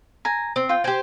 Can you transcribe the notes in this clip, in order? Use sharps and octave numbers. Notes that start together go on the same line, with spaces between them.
G#5 A#5
C4
F4 G5
G4 C5 G5 G#5